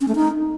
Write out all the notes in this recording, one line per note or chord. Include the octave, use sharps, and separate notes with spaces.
C#4
A3
D#4